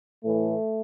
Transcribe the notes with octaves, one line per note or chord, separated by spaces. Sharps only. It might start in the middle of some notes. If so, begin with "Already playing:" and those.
A2 E3 A3